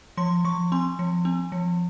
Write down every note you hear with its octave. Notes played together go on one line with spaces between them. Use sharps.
F3 C6
F3 C#6
C4 C6
F3
C4
F3